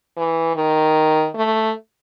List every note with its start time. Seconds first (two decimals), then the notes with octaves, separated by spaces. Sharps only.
0.17 E3
0.56 D#3
1.35 A3